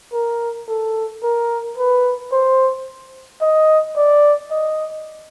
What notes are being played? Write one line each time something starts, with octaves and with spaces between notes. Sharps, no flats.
A#4
A4
A#4
B4
C5
D#5
D5
D#5